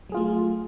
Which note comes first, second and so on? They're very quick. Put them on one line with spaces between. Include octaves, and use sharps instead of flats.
F#3 G#4 F4 A3